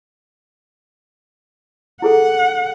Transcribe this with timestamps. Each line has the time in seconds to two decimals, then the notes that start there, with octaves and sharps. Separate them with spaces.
2.02 E4 G#4 A4 F#5